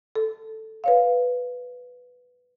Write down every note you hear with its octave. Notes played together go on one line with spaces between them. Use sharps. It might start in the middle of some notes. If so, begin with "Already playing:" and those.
A4
B4 C#5 F5